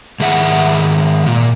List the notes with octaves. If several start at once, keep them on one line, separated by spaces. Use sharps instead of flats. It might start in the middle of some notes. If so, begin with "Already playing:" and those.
G#2 D#3 G#4 E5 F#5
A#2